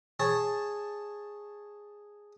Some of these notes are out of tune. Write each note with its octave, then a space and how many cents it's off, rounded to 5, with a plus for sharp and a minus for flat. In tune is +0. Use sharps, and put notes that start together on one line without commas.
G#4 -5 C#5 -5 A5 +0